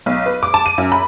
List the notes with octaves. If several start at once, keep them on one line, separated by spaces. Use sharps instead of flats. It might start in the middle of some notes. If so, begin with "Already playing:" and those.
B1
B4
D6
A5
D#7
F#2
B5